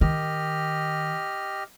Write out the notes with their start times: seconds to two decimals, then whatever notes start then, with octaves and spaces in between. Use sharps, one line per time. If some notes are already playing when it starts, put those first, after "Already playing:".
0.01 D#3 G4 D#5 F6